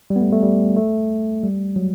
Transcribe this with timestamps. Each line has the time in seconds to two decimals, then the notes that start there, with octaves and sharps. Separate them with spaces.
0.10 G3
0.16 B3
0.21 A3
0.32 A3
0.42 G3
0.77 A3
1.43 G3
1.76 F#3